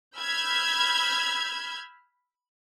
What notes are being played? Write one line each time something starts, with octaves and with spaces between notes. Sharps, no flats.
B5 E6 F6 G6 G#6